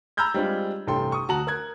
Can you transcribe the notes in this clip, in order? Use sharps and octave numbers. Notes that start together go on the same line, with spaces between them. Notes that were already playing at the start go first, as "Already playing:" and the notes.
A#5 B5 E6 F6 G6 G#6
G3 G#3 C4 D4 F4
A1 G2 C3 A4 G5 C6
C#6 D#6
D2 F#4 A5 A#5 F#7
A#4 F#6 G#6